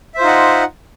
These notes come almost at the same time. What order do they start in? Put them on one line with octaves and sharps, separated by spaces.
E5 C5 F4 D#4 F#5